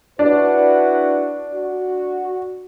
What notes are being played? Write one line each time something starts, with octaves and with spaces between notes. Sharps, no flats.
D4 E4 F#4 B4
F#4